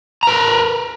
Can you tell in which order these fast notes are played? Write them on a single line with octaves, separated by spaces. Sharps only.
A#5 B4 A#4